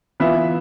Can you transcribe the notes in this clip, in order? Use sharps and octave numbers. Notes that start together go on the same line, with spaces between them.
E3 B3 F4 E5